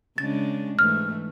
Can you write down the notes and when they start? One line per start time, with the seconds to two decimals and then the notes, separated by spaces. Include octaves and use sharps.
0.18 C#3 G#3 D4 A6
0.79 G#2 E3 A3 F6